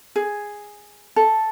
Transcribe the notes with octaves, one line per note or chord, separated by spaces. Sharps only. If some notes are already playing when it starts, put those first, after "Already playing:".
G#4
A4